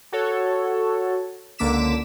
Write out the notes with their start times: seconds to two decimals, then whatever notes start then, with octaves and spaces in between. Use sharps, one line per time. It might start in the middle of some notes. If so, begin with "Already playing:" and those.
0.12 F#4 A4 C#5
1.59 C#2 D3 A#3 D6 B6 E7